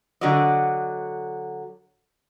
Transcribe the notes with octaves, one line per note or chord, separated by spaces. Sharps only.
D3 F#3 F#4 D5 D#5